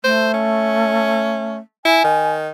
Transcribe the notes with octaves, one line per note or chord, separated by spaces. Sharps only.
A3 C5
C#4
E4 G#5
D#3